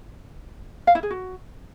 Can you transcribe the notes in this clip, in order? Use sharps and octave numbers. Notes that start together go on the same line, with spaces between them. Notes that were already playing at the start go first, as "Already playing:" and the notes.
F5
E4
G#4
F#4